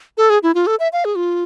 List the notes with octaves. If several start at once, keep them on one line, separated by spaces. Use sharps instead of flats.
A4
G#4
E4
F4
A4
E5
F5
G#4
F4